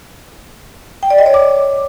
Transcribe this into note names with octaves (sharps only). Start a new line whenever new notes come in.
G5
D5
D#5
C#5
D6